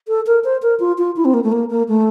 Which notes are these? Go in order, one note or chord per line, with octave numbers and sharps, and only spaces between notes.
A4
A#4
C5
A#4
F4
F4
E4
C4
A#3
A3
A#3
A#3
A3